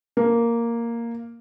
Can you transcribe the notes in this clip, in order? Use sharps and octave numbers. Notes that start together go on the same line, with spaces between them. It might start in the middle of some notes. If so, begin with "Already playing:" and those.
A#3